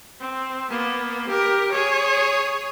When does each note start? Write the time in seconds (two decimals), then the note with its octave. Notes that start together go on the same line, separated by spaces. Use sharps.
0.21 C4
0.70 A#3 B3
1.28 G4 A#4
1.72 G#4 C#5